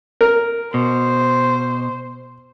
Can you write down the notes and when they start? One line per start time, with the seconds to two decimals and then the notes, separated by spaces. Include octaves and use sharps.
0.21 A#4
0.74 B2 C5